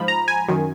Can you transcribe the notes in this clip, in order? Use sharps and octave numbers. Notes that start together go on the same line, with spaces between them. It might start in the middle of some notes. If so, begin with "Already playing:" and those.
Already playing: G#2 F3 B5
A#5
G#5
F#2 D#3